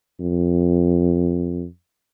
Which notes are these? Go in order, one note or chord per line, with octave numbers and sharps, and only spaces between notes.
F2